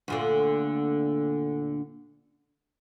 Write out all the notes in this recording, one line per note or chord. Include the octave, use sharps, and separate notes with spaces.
D2 A#2 D3